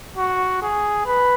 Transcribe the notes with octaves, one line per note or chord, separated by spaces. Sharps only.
F#4
G#4
B4